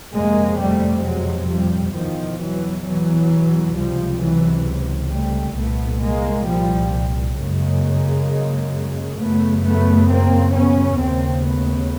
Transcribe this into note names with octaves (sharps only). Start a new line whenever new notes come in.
F2 C3 G#3 A#3
G3 A3
F#3 G#3
F3 G3
E2 B2 D#3 F3
E3 F#3
E3 F#3
C#2 C3 F3 G3
E3 F#3
G3 A3
C2 A#2 A3 B3
G#3 A#3
F3 G3
F#2 C#3 G#3 A#3
F#2 C#3 A3 B3
A3 B3
A#3 C4
B3 C#4
D#2 C#3 A#3 C4
A3 B3